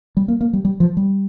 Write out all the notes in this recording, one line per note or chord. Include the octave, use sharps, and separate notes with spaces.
G3
A#3
A#3
G3
G3
F3
G3